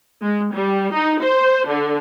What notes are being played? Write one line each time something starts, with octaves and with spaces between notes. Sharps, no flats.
G#3
G3
D#4
C5
D3